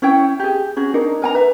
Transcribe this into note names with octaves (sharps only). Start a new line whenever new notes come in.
C#4 E4 C#5 G5
G4 G#4
C#4 F#4 G#4
D4 D#4 A#4
A#4 G#5 A#5
B4 E5